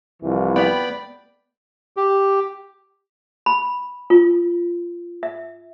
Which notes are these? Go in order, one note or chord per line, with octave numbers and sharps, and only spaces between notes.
C2 E3 F3
B3 D5 G5 B5
G4
B5
F4
E5